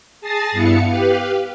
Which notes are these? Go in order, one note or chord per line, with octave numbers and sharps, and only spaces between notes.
G#4 A5 D#6 A6 A#6 C7
G2 B3 E4 F5 C#7
G4 B4 F5